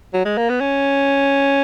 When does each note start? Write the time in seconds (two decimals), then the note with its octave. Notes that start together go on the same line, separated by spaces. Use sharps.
0.14 F#3
0.25 G#3
0.38 A#3
0.50 B3
0.61 C#4